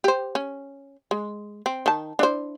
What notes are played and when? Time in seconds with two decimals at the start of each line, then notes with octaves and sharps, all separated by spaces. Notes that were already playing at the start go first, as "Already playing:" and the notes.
0.04 G4 C5
0.35 C#4
1.11 G#3
1.66 C4
1.86 D#3 A5
2.19 D4 E4 C5